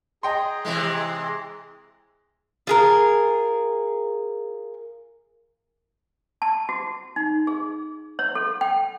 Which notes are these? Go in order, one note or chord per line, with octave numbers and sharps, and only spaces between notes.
G#4 D#5 G5 A#5 C6
C3 E3 G#3
F4 G#4 A#4
A5
F#4
D#4
G#4
C#5
A4
G5